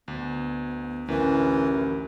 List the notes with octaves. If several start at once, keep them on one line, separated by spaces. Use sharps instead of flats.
D2 B3
A1 D2 E3 A#4